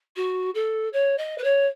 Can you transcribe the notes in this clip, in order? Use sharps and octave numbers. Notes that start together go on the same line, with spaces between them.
F#4
A4
C#5
D#5
B4
C#5